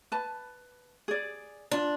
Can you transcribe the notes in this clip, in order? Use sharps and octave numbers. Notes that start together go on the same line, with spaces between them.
B4 A5
G#4 D5
D4 F4